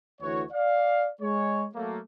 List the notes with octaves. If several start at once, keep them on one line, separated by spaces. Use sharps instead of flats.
D2 E3 F#4 C#5
D5 F5
G#3 C#5
F#3 A3 A#3